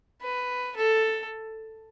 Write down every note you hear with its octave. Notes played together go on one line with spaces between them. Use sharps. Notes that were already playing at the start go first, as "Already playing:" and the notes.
B4
A4